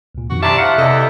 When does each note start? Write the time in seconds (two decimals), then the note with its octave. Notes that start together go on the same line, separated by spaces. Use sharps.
0.15 C#2 A#2
0.30 F2 B2 D#3 F#4
0.43 C3 G3 D4 E4 E5 A5 A#5 C#6
0.58 F3 F5 F#5
0.78 E2 C3 G3 A4 D#5